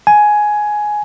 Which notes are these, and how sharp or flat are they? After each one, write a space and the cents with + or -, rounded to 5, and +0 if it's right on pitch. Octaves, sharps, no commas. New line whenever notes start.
G#5 +10